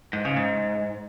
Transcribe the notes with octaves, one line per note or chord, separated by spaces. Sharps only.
G#2
C#3
G#2